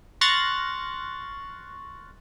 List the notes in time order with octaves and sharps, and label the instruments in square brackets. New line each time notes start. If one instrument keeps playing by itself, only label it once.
[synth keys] C6 C#6 F6 F#6 A6 A#6